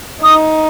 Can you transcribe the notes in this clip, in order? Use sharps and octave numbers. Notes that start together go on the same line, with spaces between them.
D#4 D#6